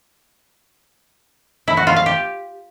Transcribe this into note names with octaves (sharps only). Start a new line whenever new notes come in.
E4
F#4
F4
F5
G4